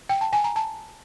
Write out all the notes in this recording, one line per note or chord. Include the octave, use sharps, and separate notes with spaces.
G5
A5
G#5
A#5
A5